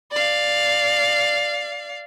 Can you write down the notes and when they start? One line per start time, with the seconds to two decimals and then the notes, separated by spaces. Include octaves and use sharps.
0.12 D5 F5